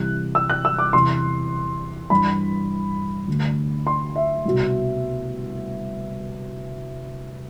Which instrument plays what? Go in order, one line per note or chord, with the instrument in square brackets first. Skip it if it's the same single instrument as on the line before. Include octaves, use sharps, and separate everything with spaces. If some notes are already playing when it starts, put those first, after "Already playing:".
Already playing: [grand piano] C2 C3 E3 F#6
E6
F#6
E6
D6
E2 C3 E3 C6
G2 E3 B5
D2 D3
C6
E5
C2 B2